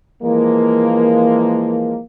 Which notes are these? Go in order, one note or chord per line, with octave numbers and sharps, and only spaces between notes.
E3 F3 G#3 A#3